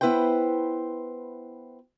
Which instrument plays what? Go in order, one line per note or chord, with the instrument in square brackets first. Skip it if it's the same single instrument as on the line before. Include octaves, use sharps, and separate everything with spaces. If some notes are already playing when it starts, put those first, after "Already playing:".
[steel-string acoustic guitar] B3 E4 B4 C5 G5